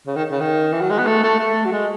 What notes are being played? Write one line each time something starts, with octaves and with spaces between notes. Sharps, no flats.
C#3
D#3
C#3
D#3
E3
F#3
G#3
B3
A3
A3
A3
F#3
G#3